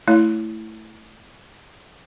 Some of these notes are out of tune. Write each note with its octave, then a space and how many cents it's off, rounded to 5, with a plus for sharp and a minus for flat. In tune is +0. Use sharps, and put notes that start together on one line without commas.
A3 +0 E4 +0 C#5 +25